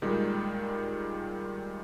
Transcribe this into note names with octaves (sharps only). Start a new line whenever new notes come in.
A#2 D#3 G3 G#3